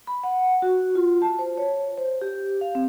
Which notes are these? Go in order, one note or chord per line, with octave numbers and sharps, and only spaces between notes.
B5
F#5
F#4
F4
A5
C5
C#5
C5
G4
F5
C4